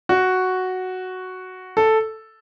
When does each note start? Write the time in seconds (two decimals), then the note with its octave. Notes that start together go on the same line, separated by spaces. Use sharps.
0.09 F#4
1.77 A4